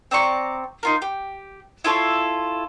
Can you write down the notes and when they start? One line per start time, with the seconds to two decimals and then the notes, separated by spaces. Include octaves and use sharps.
0.11 C4 D5 A#5 C#6
0.83 D#4 F4 A#4
1.02 G4
1.84 E4 F4 A4 C#5